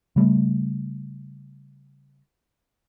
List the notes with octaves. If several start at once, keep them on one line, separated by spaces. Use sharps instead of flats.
C#3 G3 A3